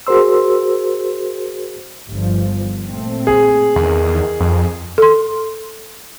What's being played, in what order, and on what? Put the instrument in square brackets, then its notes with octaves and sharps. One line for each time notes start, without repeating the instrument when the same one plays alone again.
[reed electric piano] F#4 G#4 A#4 C5 C6 E6
[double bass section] G1 F3 G3
A#2 A3 C4
[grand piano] G#4
[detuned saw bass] E2 [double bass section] D#3
[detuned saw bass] F2
[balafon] A4 C6